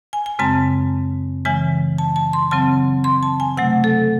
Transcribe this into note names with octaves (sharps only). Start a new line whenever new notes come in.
G#5
G#5
F#2 C#3 G#3 C4 A5
C#3 E3 G#3 G#5
A5
A5
C6
C#3 F#3 C4 A5
C6
A5
G#5
C3 F#3 A3 F#5
A4